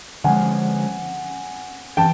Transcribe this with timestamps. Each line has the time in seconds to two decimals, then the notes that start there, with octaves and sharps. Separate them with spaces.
0.24 D3 F3 G#3 F#5 G#5
1.97 E3 G5 A5